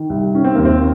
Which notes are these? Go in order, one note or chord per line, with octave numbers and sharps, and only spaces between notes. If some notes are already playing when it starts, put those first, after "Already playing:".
Already playing: D#3
C2
D#3 C#4
C4
D#2 A#3
C4